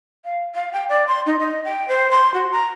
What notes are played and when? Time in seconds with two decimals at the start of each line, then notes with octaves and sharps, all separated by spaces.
0.25 F5
0.55 F5
0.73 G5
0.89 D5
1.07 C6
1.26 D#4
1.39 D#5
1.65 G5
1.88 C5
2.11 C6
2.34 F#4
2.52 A#5